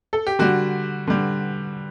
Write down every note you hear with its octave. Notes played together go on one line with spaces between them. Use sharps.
A4
G4
D3 G3 F#4
D3 G3